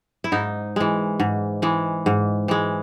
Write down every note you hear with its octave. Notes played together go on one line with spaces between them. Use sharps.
E4
G#2 D#4
E3 G#3
G#2
E3 G#3
G#2
E3 G#3